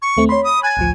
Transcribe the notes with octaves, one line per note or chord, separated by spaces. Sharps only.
C#6
D#2 A3 C4
C#5 B5 C6
D#6
G#5 F#6 A6
A1 D2 F3